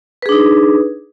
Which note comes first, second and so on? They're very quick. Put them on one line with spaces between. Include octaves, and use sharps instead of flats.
B4 G#4 D4 D#4